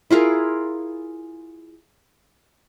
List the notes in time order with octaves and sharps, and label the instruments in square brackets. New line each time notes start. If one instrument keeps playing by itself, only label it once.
[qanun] E4 F4 G#4 A#4